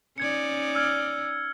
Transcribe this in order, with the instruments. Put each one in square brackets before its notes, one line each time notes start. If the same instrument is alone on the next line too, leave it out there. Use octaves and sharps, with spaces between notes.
[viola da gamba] C#4 D#4 D5 [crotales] G#6 C#7
[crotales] E6 F6 G#6